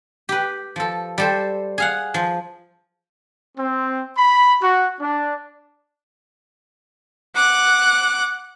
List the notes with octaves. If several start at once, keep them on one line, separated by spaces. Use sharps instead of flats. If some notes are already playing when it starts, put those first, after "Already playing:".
G4 B4
F3 A4
G3 A4 C5
G#4 F5 F#5
F3
C4
B5
F#4
D4
F#5 D6 F#6